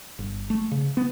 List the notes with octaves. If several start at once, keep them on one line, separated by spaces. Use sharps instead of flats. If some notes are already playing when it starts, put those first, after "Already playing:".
G1
A3
C#3
B3